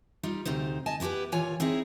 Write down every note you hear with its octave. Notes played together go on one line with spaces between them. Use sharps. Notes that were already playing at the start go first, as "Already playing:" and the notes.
G3 D#4 F4
D2 C3 D#4 C5
D#5 G#5 A5
B3 E4 F#4 G4 B4
D#2 A#2 E3 F4 C#5 G#5
C4 D#4 E4 G#4